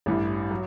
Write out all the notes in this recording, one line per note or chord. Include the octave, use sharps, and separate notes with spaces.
A1 G2 E3
F#3